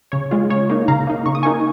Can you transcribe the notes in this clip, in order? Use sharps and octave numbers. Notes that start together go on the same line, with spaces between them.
C#3 C#5
G#3 F4
C#3 C#5
A#3 D#4
C#3 F5 A#5
A#3 D#4
C#3 C#6
D#6
A#3 D#4 G#5 C#6